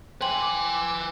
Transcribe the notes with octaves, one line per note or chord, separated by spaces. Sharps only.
B4 G5 G#5 C6 F#7
D6